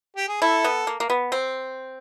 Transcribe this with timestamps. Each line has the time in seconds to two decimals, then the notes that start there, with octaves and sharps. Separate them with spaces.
0.17 G4
0.29 G#4
0.42 E4 A4
0.64 B3
0.87 A#3
1.00 A#3
1.10 B3
1.32 C4